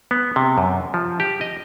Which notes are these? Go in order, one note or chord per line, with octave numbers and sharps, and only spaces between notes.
B3
C3
F#2
F3
G4
D#5